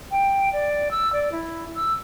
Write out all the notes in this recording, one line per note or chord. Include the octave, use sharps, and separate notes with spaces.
G5
D5
E6
D5
E4
E6